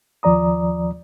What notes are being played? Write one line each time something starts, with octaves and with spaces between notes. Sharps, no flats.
D#2 F3 D5 A#5 D#6